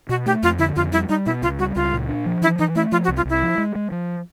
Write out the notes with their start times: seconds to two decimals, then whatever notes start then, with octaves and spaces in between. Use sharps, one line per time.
0.09 B2 F#4
0.26 A3 G4
0.43 F2 F4
0.59 D3 E4
0.76 F2 F4
0.92 G3 E4
1.09 G3 D#4
1.26 B2 E4
1.42 C#2 F4
1.59 G3 F#4
1.75 C#2 F4
1.93 A#2
2.09 D4
2.26 F3
2.42 E3 E4
2.59 E3 D#4
2.75 A3 E4
2.92 F3 F4
3.04 F#4
3.08 C2
3.17 F4
3.25 C2 E4
3.42 F3
3.58 G#3
3.75 G#3
3.91 F3